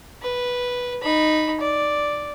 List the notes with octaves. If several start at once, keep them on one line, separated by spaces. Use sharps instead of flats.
B4
D#4 B5
D5